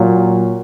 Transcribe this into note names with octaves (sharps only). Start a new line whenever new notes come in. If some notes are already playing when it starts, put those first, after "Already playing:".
Already playing: A#2 F#3 A#3